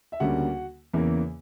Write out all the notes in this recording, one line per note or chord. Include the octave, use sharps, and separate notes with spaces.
E5
D2 C#3 G3 A#3 F#4 F#5
E2 C#3 E3 A#3